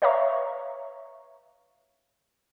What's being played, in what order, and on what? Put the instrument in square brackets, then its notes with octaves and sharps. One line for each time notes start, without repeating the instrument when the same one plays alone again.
[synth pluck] B4 C#5 E5 F5 A#5 C#6